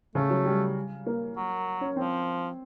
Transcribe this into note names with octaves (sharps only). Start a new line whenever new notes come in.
C#3 A3
F#3
G3
A#3
F#3
C#4
F3 C4